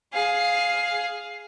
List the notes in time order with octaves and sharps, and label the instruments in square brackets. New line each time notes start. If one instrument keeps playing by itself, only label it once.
[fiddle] G#4 F5